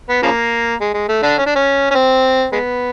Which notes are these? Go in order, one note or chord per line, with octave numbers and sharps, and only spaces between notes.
B3
C#3 F3 A#3
G#3
G#3
A3
D3 D4
C#4
D4
C#4
C#4
C4
G#3 B3